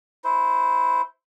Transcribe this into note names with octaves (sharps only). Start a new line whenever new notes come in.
E4 C5